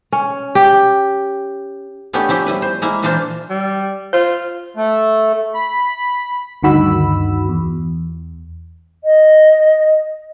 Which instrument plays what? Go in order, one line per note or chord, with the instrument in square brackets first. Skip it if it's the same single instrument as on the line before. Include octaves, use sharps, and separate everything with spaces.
[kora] C#4
G4
[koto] A3 B3 C#4 D4 G4
F3 C#4 E4 G4
G3 E4 B4
C5
G#3 A#3 E4
A#2 E3 A#3 D4 F4 C5
[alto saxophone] G3
[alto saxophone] F4 [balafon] C5
[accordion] A3
B5
[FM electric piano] D2 G2 D#3 F#4 B5 E6
E2
[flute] D#5